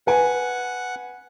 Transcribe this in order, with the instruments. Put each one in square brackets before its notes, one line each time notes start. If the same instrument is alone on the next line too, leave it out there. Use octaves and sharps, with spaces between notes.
[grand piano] B4 G#5 [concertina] F#5